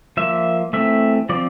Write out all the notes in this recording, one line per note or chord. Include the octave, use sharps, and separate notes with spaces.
F3 A#3 E5
E3 A3 C4 E5
F3 C4 D5